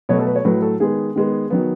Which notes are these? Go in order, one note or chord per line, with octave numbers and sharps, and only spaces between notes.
B2 F#3 A3 C#5
A4
B4
C#5
A2 F#3 A3 B4
A4
D#3 G#3 B3 G#4
D#3 G#3 B3
D#3 F#3 B3